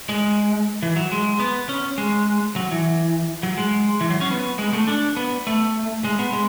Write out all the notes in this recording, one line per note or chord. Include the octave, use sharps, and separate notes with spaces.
G#3
E3
F#3
G#3
B3
C#4
G#3
F#3
E3
F#3
G#3
E3
F#3
C#4
B3
G#3
A3
D4
B3
A3
G#3
B3
G#3